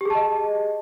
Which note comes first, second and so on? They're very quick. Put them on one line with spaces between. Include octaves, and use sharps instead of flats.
G4 G#4 A5 D#5